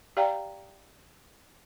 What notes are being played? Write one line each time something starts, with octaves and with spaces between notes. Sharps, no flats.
G4 D5 F5 G5 A#5